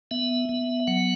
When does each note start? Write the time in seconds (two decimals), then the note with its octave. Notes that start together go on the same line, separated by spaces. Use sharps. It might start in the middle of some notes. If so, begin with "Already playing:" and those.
0.11 B3 E5
0.49 B3
0.87 F#3 F#5